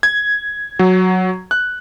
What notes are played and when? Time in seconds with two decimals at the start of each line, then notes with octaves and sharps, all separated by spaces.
0.03 G#6
0.79 F#3
1.51 F#6